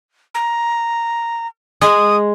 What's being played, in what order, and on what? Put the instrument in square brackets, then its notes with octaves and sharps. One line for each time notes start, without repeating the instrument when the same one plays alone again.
[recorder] A#5
[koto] G#3 [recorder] D#6